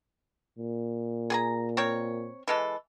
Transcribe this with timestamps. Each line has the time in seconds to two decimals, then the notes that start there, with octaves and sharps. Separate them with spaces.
0.59 A#2
1.30 G#4 G#5 A#5
1.77 C4 A#4 C#5
2.48 E3 G#3 A4